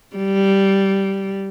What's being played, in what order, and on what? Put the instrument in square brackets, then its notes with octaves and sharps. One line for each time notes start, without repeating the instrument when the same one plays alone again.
[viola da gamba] G3